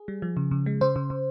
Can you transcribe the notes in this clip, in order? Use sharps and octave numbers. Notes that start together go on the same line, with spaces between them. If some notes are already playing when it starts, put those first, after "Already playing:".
Already playing: G#4
G3
F3
C#3
C#3
G#3
C#3 C5
C#3
C#3